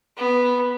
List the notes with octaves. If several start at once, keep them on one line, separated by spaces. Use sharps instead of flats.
B3